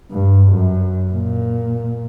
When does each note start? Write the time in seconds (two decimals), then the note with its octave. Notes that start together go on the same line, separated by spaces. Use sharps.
0.12 G2
0.51 F#2
1.13 A#2